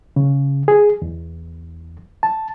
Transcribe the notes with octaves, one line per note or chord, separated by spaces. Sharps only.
C#3
G#4
E2
A5